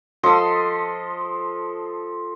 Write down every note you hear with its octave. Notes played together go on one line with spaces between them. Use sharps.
F3 A4 D#5 C6